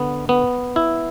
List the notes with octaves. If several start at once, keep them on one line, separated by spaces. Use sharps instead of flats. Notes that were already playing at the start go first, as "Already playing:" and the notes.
Already playing: D3 B3
B3
E4